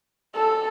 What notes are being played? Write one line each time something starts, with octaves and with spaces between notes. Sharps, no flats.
A4